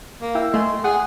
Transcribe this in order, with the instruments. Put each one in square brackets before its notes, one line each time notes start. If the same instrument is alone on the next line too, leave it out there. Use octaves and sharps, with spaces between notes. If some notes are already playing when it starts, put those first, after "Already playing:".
[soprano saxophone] A#3
[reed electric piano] E4 G5 E6
[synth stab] A3 [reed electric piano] D#5 G#5 [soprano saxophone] C6
[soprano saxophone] G#4 [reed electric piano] F#5 F#6